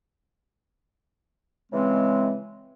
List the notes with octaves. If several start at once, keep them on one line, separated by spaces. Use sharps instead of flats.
C#3 E3 G#3 C4